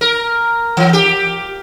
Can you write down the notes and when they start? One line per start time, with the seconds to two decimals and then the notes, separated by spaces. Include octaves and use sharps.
0.01 A#4
0.77 E3
0.93 G4